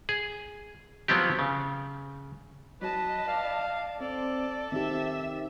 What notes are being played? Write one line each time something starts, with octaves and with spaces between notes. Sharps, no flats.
G#4
F3 F#3 B3 C4 G4
C#3
F#3 B4 D#5 A5
D5 F5
C4 A4 D5
D#3 C4 G4 E5